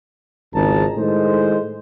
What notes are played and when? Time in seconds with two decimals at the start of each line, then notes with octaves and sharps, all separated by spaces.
0.54 G#1 C#2 G#4 A5 A#5
0.97 A2 D#3 G#3 C5